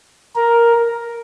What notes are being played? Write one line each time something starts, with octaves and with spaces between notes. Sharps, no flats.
A#4